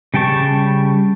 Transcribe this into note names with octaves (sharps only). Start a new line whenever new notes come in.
C#3 G3 G5 A5 C#6